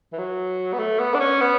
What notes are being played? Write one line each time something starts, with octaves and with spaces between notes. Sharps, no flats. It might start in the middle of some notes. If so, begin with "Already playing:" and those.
E3
F#3
B3
A3
B3
D4
C#4
B3